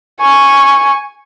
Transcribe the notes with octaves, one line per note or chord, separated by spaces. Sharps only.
G#5 C#6